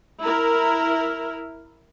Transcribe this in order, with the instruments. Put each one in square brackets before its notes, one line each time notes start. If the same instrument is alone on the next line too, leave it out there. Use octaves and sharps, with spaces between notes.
[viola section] E4 A#4